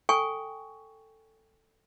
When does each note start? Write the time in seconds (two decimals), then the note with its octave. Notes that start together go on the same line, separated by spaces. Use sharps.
0.09 A4 G5 G#5 C#6